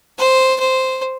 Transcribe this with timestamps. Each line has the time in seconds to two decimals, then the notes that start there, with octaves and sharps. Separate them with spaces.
0.18 C5
0.59 C5